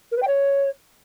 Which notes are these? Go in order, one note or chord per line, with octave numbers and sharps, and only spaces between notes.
A#4
B4
G5
C#5